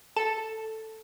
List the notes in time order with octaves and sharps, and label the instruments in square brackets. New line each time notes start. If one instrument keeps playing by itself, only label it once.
[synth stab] A4